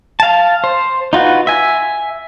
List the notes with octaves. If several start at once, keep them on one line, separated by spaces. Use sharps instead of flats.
F5 A5
C5
D#4 F4 F#4 B4
E5 G#5